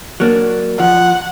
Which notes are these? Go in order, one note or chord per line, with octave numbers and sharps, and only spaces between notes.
F#3 A#3 D4
F3 F#5